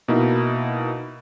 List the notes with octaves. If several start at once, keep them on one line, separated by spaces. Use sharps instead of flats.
B2 A#3 D#4 E4